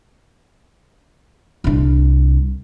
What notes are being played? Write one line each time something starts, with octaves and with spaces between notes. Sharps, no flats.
C2 D4